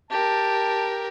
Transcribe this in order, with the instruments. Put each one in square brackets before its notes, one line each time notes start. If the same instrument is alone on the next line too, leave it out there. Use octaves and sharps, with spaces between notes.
[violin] G4 A#4 [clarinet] A5